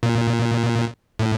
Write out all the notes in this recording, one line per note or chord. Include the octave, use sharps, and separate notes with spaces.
A#2
A2